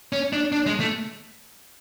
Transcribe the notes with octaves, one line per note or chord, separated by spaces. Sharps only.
C#4
D4
D4
G#3
A3